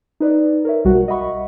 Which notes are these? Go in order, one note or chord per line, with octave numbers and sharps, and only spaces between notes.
D#4 B4 D5
A#4 C#5 E5
B1 G3 F#4 A#4 F#5
D#5 E5 F#5 B5 C#6